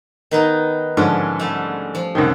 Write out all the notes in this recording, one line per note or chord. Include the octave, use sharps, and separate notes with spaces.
D#3 B3 D#4
G#2 D3 F3 C#4
G3 A3
F3
C2 F#2 D#3